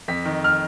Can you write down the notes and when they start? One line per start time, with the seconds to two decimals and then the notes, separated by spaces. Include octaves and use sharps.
0.08 F2 B6
0.25 D#3
0.44 F6